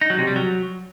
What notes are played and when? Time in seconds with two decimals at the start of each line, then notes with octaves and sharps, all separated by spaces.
0.01 D#4
0.10 F#3
0.19 C3
0.27 G3
0.36 F#3